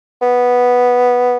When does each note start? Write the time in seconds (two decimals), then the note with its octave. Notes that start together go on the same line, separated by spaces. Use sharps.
0.22 B3